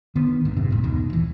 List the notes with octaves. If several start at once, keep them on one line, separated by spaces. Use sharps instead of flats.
D3 D#3 B3
B1 G#2 D3
F#1 G#2 C3
F2 A#2
D1 D#2 B2 D#3
D#1 E3